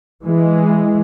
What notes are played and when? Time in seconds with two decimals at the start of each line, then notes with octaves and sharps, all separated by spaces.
0.24 E3 G#3